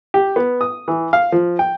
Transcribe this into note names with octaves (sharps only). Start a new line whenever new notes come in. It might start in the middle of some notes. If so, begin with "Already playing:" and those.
G4
B3
D#6
E3
F5
F3
G5